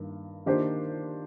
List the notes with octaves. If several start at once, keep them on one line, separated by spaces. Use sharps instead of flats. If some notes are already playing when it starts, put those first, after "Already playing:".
Already playing: G2 D#3 A#3
D#3 A#3 D4 G4 C5